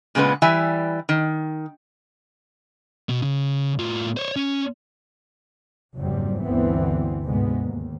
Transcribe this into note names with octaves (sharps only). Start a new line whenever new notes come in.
A#2 C#3 G#3 B3 B4
E3 G3 E5 G#5
D#3
B2
C#3
A2 F4
C5 C#5
C#4
F#1 F2 G#2 F#3 G3 C4
G1 D2 D3 E3 B3 C4
D2 G#2 C3 G#3 B3
D#2